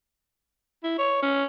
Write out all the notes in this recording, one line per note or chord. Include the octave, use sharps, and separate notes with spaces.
E4
C#5
C#4